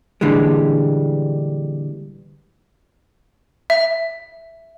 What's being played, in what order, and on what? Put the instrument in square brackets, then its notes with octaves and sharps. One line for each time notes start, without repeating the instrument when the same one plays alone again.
[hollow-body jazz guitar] A#2 D3 E3 G3 G#3
[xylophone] E5